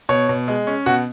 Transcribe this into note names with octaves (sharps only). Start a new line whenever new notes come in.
B2 C#5
B2
G#3
C#4
B2 F#4